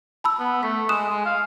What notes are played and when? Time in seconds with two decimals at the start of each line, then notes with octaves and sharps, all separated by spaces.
0.24 A5 B5 E6
0.39 B3
0.63 A3 B6
0.89 G#3 D#6 F#6 E7
1.10 G#3
1.26 F5